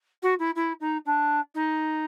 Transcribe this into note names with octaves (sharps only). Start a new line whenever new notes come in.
F#4
E4
E4
D#4
D4
D#4